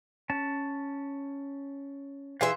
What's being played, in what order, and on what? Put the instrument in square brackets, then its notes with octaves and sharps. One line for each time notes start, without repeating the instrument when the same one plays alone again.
[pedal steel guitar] C#4 A5
[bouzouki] E3 G#4 E5 [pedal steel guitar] F5 C6